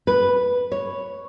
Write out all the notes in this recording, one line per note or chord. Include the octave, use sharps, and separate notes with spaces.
B4
C#5